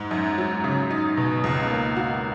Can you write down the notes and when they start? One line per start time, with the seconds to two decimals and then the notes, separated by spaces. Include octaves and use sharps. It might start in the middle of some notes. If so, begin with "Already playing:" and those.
Already playing: G#2
0.11 F#2
0.38 F#3
0.64 C#3
0.90 D#4
1.17 B2
1.44 C#2
1.70 A#3
1.96 F#4